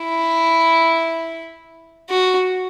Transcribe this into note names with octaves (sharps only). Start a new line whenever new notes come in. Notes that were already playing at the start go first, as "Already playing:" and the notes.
Already playing: E4
F#4